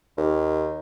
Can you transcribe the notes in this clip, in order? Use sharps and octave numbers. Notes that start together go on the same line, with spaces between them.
D#2